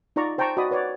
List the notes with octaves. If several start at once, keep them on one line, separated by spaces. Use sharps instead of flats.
D#4 F4 D5 A#5 C#6
C5 G5 A5 A#5 C#6
F#4 D5 D#5 B5 D#6
B4 C#5 D5 F#5